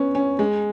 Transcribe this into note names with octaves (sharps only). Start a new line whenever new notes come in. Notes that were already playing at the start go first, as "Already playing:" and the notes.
Already playing: B3 C#4
C#4
G#3